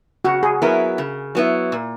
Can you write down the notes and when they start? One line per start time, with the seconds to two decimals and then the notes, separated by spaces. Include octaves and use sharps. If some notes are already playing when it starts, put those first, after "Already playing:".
0.25 C#3 F#4
0.43 G#4
0.62 F#3 B3 E4 A#4
0.98 C#3
1.35 F#3 B3 E4
1.72 A#2